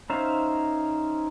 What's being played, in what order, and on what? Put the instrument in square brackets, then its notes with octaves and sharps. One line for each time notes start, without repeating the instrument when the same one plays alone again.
[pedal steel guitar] C#4 D#4 C5 E5 F5